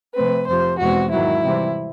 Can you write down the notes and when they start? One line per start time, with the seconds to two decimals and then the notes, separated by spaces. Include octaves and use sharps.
0.15 C3 F3 A3 C4 B4
0.48 F2 C3 F3 C5
0.80 E2 B2 G#3 C4 F#4
1.12 G#2 D#3 F#3 E4
1.44 C3 E3 G3 C4